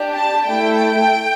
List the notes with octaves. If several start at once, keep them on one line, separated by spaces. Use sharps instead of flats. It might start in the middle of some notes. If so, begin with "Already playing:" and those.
Already playing: D4 G4
A5
A3 E4 A4 G5